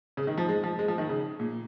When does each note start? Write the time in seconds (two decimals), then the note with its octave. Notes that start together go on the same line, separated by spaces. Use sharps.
0.17 C#3
0.27 D#3
0.38 F3
0.49 G#3
0.63 F3
0.79 G#3
0.88 F3
0.98 D#3
1.09 C#3
1.40 A#2